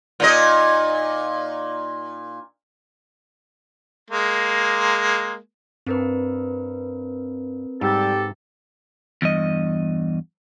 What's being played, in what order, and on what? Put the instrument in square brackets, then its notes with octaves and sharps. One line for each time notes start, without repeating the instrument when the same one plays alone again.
[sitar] A#2 D#4 D#5
[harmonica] G#3 A#3
[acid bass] G2 [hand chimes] C4 A#4 B4
[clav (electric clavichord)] G#2 [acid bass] G3 [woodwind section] G4 A4
[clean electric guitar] E2 G2 D#5